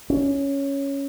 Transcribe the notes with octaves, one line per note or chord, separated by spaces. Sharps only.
C#4